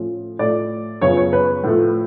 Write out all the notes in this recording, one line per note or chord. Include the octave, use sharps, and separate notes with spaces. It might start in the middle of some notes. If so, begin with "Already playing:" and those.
Already playing: A2 F3 A3 C#4
A2 F3 A3 D5
F#2 C#3 F3 B3 C#5
C#5
B4
A2 F3 A3